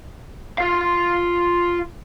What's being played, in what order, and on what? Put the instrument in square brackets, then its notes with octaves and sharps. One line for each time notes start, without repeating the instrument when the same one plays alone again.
[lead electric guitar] F4 F5